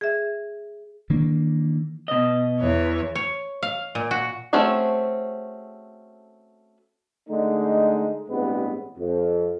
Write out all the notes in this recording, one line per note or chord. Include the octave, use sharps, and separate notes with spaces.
G#4 E5
D#3 E3 A#3 D4
B2 D#5
E2 E3 C#5
C#5
F5
A#2
F#4
A3 C4 C#4 F#4 G#4
D3 G#3 A3 D#4
A1 G2 G#3 B3 C4 B4
F2